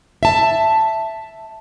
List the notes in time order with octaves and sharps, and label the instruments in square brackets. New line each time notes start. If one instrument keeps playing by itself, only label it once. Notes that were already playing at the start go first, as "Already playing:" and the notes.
[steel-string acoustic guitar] E5 A5